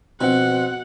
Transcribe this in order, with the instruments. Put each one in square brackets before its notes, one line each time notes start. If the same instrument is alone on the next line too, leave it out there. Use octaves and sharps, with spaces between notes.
[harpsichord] B2 F3 [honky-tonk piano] C4 [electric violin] F#5